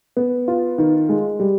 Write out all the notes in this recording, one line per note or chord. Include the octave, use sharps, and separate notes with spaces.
B3
F4
D#3
G#3
G3